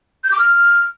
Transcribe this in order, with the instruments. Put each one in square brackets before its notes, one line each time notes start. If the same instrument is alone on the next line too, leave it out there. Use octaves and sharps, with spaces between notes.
[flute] G6
D6
F6